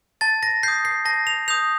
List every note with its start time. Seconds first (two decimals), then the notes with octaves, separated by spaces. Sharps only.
0.21 A5 A6
0.43 A#6
0.63 D#6 G6 C7
0.85 C7
1.05 A5 A#6
1.27 F7
1.48 D#6 G6 F7